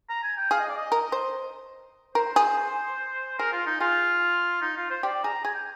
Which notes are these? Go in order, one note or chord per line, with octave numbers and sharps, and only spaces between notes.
A#5
G#5
G5
G#4 F5
D#5
D5
D#5
A#4
C5
A#4 C5
G#4
G#4 A#4
F4
D#4
F4 G#4
D#4
F4
C5
G4 D5
G#4 A#5
G#4 G#5
G5